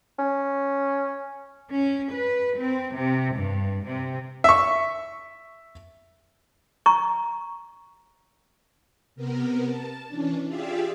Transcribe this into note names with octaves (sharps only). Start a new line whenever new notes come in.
C#4
C#4
B4
C4
C3
G2
C3
E5 C#6
A#5 C#6
C3 B3 A#4
A5
E3 C#4 D4
F4 G4 G#4 D5 E5 F5